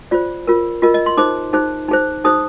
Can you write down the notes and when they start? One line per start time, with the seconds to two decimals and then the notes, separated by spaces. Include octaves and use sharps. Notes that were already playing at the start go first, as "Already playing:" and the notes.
0.11 F4 C5 D5
0.47 F4 A#4
0.82 F4 A#4 D#5
0.94 D#5
1.06 C6
1.17 D#4 G#4 C5 D6
1.53 D#4 G#4 C5
1.89 D#4 G#4 C5
2.24 D#4 G#4 C5 D#6